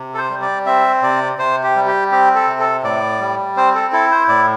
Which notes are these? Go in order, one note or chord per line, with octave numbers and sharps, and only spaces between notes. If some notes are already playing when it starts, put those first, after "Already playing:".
Already playing: C3
A4
C5
G3
D5
C4 E5
C3 D5
C3 C5
G4
G3
G4
C4 G4
A4
C3
A4
A2 D5
G3
C4 C5
A4
E4 A4
C5
A2 D5